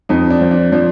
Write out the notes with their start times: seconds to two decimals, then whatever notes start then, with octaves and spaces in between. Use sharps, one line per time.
0.09 F2 D#4
0.30 D4
0.41 F3
0.51 D4
0.72 F3 D4